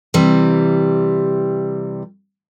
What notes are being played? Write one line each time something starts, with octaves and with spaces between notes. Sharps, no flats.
C3 E3 G3